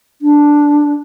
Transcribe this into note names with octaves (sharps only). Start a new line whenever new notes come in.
D4